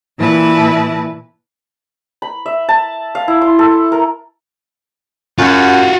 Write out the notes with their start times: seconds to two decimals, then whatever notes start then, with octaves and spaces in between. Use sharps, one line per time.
0.17 A#2 E3 E4 B4 A5
2.22 B5
2.46 E5
2.69 A5
3.15 F5
3.28 E4
3.42 C6
3.59 A4
3.92 A#4
5.38 F#2 F4 F#4